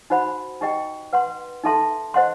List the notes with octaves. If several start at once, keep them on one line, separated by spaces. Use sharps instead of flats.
D#4 F#4 C5 F#5 B5
D#4 G4 D#5 G5
B4 F#5 C6
D#4 A4 E5 A5 C6
C5 D#5 F#5 C6